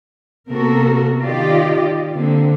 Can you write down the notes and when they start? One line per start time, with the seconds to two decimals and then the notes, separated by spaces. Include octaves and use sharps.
0.49 C3 A#3 B3 F#4 A4 A#4
1.26 D#3 F4 G4 D5 D#5
2.14 D3 A#3 C4